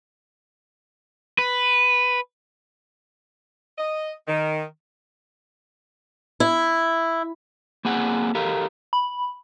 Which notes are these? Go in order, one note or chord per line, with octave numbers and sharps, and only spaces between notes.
B4
D#5
D#3
E4
A#3 C4 G#4 F#5
G4 A4 A#4 F5
B5